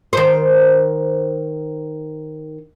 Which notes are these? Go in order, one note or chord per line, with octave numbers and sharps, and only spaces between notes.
D#3 C5